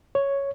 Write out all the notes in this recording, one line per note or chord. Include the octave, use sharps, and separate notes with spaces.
C#5